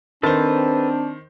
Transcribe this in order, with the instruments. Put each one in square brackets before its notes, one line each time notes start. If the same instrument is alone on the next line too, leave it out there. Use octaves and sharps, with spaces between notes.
[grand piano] D#3 C5 [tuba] C4 [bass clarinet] D4 [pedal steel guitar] A4 B4 A5